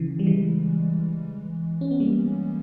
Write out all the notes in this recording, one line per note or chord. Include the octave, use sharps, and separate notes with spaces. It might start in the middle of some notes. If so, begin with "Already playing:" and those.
Already playing: C#3 E3
G3
E3 G#3
C#4
B3
G3 A#3